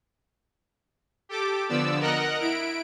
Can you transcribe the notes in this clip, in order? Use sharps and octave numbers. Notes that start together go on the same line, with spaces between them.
G4 A4 D6
D3 F3 B3 D5 E6
A#4 D#5 F#5 A#5 F#6
E4 D7